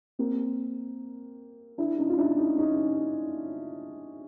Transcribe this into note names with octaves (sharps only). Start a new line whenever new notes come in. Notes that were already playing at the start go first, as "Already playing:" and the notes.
A#3 C4
D4 E4
C#4 D#4
F4
D4 E4
C#4 D#4
C#4 D#4